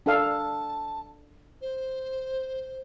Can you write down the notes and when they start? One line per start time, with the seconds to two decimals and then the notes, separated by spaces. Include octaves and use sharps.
0.06 D4 A4 F5 A5
1.61 C5